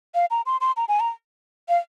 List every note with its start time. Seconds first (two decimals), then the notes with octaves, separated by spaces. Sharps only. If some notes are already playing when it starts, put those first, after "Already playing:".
0.15 F5
0.31 A#5
0.46 C6
0.61 C6
0.77 A#5
0.88 G#5
1.00 A#5
1.69 F5